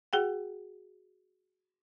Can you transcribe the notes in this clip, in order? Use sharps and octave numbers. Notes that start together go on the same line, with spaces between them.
F#4 G#4 F#5 G5